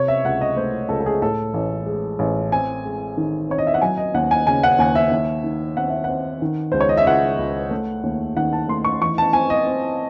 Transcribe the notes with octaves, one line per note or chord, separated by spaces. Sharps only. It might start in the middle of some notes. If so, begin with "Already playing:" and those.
Already playing: C3 C#5
E5
C#2 F#5
D#5
A3 C5
C#2 A4
A4
G#4
A2 A4
A1
G#3
A1
C4 G#5
G#3
D#3
C4 C#5
D#5
E5
F#5
F#3 G#5
D#5
D#2 F#5
G#5
C#3 G#5
F#5
D#2 G#5
E5
D#2
D#3
C4 F#5
E5
C4 F#5
D#3
C#2 C5
C#5
D#5
E5
C#2 F#5
C#2
A3
D#2
D#3 F#5
A5
A3 C6
C#6
E3 C#6
A5
C4 G#5
D#5
C4